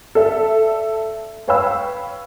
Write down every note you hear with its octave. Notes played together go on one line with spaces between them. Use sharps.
A4 D5 E5
B4 C#5 F5 G5 B5 E6